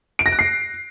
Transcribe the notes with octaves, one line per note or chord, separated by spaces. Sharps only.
D7
A#6
F#6
C7